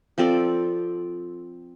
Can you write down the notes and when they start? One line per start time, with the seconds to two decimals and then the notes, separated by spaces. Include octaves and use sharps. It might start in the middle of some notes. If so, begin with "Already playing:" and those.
0.18 F3 C4 A4 D5